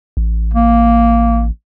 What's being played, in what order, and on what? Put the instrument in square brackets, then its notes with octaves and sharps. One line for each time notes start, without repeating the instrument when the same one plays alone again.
[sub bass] A1
[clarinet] A#3